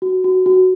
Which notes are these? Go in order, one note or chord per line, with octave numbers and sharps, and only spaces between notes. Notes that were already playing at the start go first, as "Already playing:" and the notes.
F#4
F#4
F#4